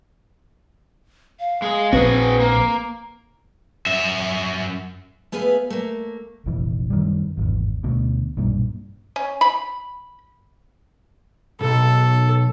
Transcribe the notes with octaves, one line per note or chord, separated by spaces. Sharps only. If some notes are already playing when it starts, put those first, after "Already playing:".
F5
G#3 G#4
A#1 C4 F#4 G#4 B4
A#3
F#2 E5
A3 B3 G#4 B4 F5
A3 A#3
F1 A#1 F2 E3
F#2 D#3 G3
G#1 E2
D2 B2
B1 G2 A#2
C#4
B5
B1 G#2 A4